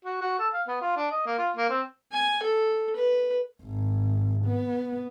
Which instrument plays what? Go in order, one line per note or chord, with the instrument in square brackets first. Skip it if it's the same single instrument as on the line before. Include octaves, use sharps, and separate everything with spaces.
[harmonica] F#4
F#4
A4
F5
B3
F4
D4
D#5
A#3
F4
A#3
C4
[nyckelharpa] G#5
A4
B4
[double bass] G#1
B3